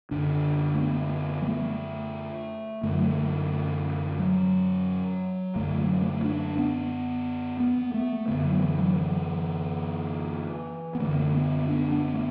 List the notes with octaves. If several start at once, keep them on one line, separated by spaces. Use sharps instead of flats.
F#2 D3 D4
A3
B3
F#3
A3
F#2 D3 A3
F#3
A3
F#3
F#2 D3 A3
F#3
A3
D4
B3
B3
A3
F#2 D3 B3
F#3
E3
F#3
E3
B3
F#2 D3 A3
B3
D4
B3
A3